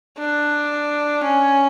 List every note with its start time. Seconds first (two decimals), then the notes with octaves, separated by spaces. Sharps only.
0.18 D4
1.24 C#4